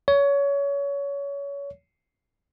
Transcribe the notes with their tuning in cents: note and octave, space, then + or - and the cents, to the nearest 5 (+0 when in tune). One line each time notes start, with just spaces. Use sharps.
C#5 +25